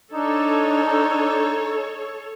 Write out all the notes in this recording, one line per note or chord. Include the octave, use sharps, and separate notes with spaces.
D4 D#4 A4 C#5